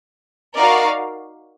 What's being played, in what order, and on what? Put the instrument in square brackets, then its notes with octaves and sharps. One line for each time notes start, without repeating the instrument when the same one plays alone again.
[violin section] D#4 F#4 A#4 D5 F5